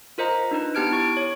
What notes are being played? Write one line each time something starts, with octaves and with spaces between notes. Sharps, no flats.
F4 A#4 C5 D#5 A#5
D4 D#4 B4
B3 G4 A5 F6 G#6 D7
E4 C#6 D7
C#5